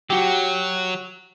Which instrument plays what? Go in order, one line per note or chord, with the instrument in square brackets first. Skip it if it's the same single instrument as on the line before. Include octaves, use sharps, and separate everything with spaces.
[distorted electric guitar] F#3 [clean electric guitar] F#4 G4